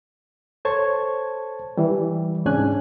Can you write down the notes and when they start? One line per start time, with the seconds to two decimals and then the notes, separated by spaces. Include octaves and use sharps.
0.65 A4 C5 C#5 A5 C#6 G#6
1.77 E3 G3
2.45 C2 G#2 C#4 D4 G#5 F#6